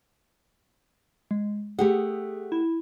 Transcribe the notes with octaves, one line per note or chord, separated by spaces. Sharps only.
G#3
A3 G4 G#4 F#5
E4